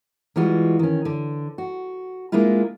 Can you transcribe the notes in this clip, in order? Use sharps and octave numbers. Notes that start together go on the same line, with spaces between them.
E3 G3 G#3 F4 F#4
D#3 C#4
D3
F#4
G#3 A#3 D4 E4 F4